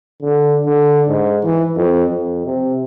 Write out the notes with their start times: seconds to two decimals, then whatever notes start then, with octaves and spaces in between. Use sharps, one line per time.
0.22 D3
0.66 D3
1.08 G#2
1.44 E3
1.76 F2
2.09 F2
2.46 C3